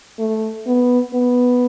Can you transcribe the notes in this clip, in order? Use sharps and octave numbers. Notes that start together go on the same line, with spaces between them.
A3
B3
B3